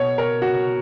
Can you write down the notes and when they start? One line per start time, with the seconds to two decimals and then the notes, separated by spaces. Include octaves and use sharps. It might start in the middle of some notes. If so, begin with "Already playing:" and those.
Already playing: B2 C#5
0.18 A#4
0.42 F#4